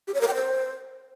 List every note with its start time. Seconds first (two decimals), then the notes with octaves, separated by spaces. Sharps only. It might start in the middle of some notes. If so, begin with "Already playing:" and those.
0.08 G4
0.14 C#5
0.21 A#4
0.28 G5
0.34 C5